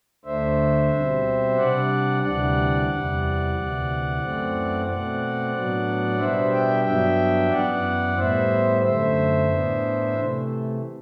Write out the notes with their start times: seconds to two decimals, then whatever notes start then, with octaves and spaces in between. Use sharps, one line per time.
0.25 D2 D3 A3 D4 C5 E5
0.91 B2 G3 C4
1.57 C3 G3 D4 D5 F#5
2.23 D2 C3 E3 G3 D4 D5 F#5
2.89 E2 C3 E3 G3
3.54 D2 C3 E3
4.21 F#2 E3 A3 C4
4.86 B2 A3 C4 D5 F#5
5.53 A2 F#3 B3 D4
6.18 B2 G3 B3 D4 C5 E5
6.51 E5 G5
6.84 G2 F#3 B3 D4 E5 G5
7.50 F#2 E3 B3 D5 F#5
8.16 A2 G3 B3 C5 E5
8.82 F#2 D3 A3 C5 E5
9.48 A2 E3 B3 D4
10.15 C3 E3 A3